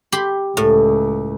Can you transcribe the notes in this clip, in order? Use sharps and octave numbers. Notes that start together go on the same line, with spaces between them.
G4 B5 C6
C#2 A2